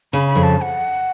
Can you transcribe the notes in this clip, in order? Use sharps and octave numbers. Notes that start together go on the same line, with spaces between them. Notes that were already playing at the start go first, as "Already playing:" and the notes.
C#3 B5
B5
F2
A5
A5
F#5